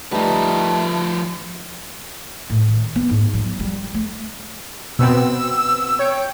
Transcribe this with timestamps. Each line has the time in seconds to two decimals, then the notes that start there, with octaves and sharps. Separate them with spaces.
0.12 F3 G3 A3 D#4 B4
2.50 A2
2.68 D#3
2.96 B3
3.09 G#2
3.33 F#3
3.60 G3
3.94 A3
4.99 B2 B3 C4 E6
5.99 C#5 G5